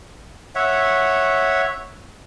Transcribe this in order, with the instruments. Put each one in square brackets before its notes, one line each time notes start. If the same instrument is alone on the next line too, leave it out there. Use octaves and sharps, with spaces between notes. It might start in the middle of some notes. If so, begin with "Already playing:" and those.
[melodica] C#5 E5 F#5